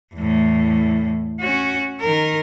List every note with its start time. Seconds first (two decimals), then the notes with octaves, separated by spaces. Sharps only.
0.14 E2 A2
1.40 C#4 F#4
2.01 D#3 A#4